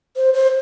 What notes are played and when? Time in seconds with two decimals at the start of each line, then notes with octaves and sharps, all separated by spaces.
0.16 C5
0.34 C5